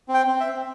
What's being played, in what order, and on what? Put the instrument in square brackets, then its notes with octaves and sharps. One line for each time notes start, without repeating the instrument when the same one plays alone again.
[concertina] C4
G5
C4
E5
C4